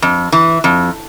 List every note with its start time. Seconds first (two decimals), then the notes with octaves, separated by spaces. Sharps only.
0.02 F2
0.32 E3
0.64 F2